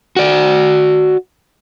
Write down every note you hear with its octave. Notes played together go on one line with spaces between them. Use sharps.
F#4 D5